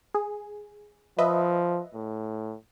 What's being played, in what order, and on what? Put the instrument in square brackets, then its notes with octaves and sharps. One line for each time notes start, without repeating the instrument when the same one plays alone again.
[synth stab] G#4
[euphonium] F3 [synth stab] B4 D#5 E5
[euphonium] A2